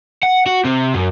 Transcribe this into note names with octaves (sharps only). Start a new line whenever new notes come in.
F#5
F#4
C3
F#2